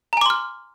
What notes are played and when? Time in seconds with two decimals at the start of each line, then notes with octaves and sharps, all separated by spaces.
0.13 A#5
0.17 G#5
0.21 D6
0.26 C6
0.30 F6